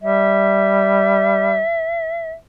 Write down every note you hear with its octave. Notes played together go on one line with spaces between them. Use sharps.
G3 E5